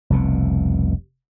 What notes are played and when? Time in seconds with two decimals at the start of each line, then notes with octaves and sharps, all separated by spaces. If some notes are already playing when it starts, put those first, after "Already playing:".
0.10 F1 C2 B2